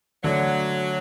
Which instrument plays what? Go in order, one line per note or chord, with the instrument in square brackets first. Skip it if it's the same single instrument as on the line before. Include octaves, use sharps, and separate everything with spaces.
[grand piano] D3 A3 D4 A4 D5 [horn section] F#3